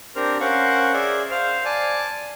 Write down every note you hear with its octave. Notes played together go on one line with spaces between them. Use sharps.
C4 D4 G4 A#4 C5 F6
C#4 A#4 C5 F5 F#5 C#6
G#4 D5 E5
C5 F5 F6
D5 G#5 A5
A5